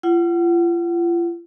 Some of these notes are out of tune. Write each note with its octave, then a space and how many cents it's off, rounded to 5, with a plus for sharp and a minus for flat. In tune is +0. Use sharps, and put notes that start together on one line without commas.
F4 -35 F#5 +20